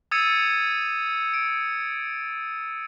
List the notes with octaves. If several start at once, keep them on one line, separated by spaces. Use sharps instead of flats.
D#6 E6 G#6 A6 C#7 D#7
D7